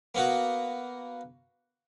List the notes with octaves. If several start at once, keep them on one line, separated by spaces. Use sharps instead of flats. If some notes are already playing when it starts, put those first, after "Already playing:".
A#3 B3 F#4